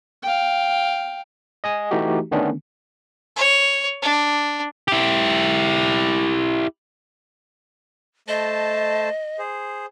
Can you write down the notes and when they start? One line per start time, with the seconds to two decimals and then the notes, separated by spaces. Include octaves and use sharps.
0.23 F5 G5
1.64 D#5 G#5 D#6
1.91 E3 A3 D#4 F#4 G4
2.31 D3 D#3 A3 B3 C#4 D4
3.36 C#5
4.02 D4
4.88 E4 G4
8.28 A3 C5 D#5 A5
9.39 G#4 C5